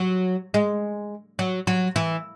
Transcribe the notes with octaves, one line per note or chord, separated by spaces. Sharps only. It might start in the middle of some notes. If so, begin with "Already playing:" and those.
Already playing: F#3
G#3
F#3
F#3
E3